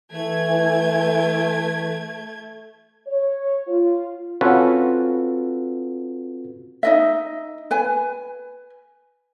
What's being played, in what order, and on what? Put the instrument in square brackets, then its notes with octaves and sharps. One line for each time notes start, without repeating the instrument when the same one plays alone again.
[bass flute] E3 [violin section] A3 G#6
[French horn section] C#5
F4
[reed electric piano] C4 C#4 F4 F#4 A4 B4
[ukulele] D#4 D#5 E5
B4 G#5